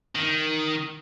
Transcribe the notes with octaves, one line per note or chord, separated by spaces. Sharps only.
D#3